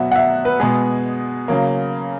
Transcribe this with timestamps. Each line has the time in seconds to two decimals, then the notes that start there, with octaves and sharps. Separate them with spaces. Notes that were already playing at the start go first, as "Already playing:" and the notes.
Already playing: B2 F#3 B3 E5 F#5
0.12 F#5
0.16 E5
0.45 B4
0.60 B2 G#3 B3 G#4
1.48 C#3 F#3 A#3